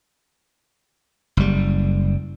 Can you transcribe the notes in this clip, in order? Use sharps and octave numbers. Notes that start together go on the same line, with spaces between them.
F#1 G3